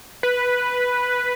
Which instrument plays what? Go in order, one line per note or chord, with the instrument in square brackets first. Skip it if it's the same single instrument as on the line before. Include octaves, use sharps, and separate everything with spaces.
[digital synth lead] B4